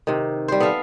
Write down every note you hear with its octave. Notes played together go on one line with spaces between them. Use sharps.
C3 D#3
G3 C5
B3 A4 E5 F5